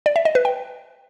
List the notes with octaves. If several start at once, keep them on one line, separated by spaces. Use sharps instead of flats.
D5
E5
D#5
B4
G5